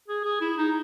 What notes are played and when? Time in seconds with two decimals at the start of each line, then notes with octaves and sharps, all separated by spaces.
0.08 G#4
0.24 G#4
0.41 E4
0.58 D#4